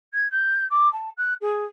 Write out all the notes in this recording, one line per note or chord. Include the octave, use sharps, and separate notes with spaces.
G#6
G6
D6
A5
F#6
G#4